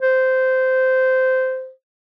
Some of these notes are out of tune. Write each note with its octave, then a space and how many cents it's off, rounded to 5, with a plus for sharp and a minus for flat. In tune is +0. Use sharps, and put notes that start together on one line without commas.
C5 -15